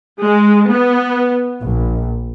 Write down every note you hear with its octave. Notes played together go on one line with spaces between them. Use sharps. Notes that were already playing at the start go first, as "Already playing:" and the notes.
G#3
B3
A#1